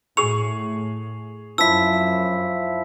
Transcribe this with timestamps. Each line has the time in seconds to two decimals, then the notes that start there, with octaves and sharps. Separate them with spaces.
0.17 A2 G#4 C#6 F7
1.58 F#2 F3 E4 E6 B6